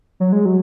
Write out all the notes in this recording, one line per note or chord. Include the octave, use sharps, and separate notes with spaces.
F#3
G#3
F#3